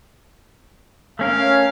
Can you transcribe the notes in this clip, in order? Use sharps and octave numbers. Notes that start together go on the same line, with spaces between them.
A3 C#4 A#4 F5